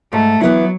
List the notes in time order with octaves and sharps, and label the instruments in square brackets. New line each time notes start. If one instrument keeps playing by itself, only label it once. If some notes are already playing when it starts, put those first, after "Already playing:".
[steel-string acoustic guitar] G#2 [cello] A3
[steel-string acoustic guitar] E3 B3 E4 [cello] F#3